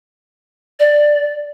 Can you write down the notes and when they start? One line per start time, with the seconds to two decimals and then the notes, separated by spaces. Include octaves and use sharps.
0.80 D5